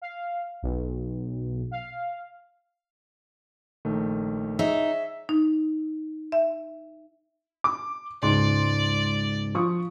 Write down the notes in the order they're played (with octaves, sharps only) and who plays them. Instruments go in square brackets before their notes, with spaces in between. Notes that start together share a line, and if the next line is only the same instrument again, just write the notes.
[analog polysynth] F5
B1
F5
[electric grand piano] A#1 D#3 A3
[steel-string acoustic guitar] D#4 [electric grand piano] G#4 C#5 [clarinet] E5
[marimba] D#4
E5
[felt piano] D6
[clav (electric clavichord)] C#2 G#2 [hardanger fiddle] D5 [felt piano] C6
[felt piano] F3 C#6 D#6